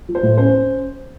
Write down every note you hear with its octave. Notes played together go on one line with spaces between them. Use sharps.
F3
C5
A2
C#4 C5
C#4